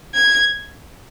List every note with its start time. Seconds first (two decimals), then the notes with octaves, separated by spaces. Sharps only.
0.15 G#6